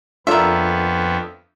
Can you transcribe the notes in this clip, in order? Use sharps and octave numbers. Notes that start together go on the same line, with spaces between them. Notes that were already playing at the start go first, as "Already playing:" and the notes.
F2 B3 D4 F4 A4 A#4 E5